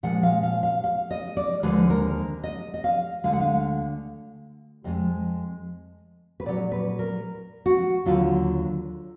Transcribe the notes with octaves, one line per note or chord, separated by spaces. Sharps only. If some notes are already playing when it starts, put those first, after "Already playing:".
A#2 F3 G#3 F#5
F5
F5
F5
F5
D#5
D5
D#2 D3 F3 G#3 B4
A#4
D#5
D#5
F5
D2 D3 G#3 F5
F#5
F5
F2 F3 G#3 D#5
B4
A#2 F#3 D5
B4
A#4
F#4
D#2 D3 F#3 F4